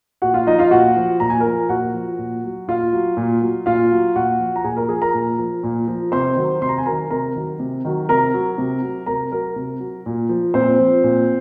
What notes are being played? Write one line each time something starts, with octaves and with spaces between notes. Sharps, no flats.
A#2 F#4 F#5
F4 F5
F3 D#4 D#5
F4 F5
A#2 F#4 F#5
F3
A#2 A#5
G#5
A#4 A#5
F3
A#2 F#4 F#5
F3
A#2
F#3
A#2 F4 F5
F#3
A#2
F#3
A#2 F4 F5
F#3
A#2 F#4 F#5
F3
A#5
A#2 G#4 G#5
A#4 A#5
F3 G#4 G#5
A#4 A#5
A#2
F3
A#2
F3
C3 C5 C6
D#3 F#3
C3 C6
A#5
G#5
D#3 F#3 A#4 A#5
C3 A#4 A#5
D#3 F#3
C3
D#3 F#3
C3 A#4 A#5
F#3
C3
F#3
C3 A#4 A#5
F#3 A#4 A#5
C3
F#3
A#2
F3
A#2 C4 C5
F3
A#2